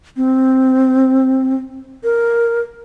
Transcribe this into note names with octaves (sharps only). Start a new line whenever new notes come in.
C4
A#4